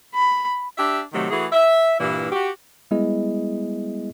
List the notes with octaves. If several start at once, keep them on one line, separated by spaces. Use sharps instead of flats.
B5
D4 G4 E5
C3 D#3 F#3 A3
E3 A3 F#4 G#4
E5
G2 A#2 E3 G3 E4
F#4 G4
G3 G#3 B3 E4 G#4 D#5